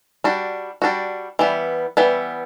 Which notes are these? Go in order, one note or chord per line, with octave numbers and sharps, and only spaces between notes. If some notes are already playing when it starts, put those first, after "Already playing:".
G3 D4 F#4
G3 D4 F#4
E3 G3 B3
E3 G3 B3